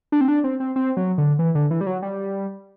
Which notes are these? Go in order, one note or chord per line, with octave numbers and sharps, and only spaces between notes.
D4
C4
D4
C4
C4
C4
F#3
D3
E3
D3
E3
G3
F#3
G3